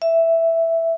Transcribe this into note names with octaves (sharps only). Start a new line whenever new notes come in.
E5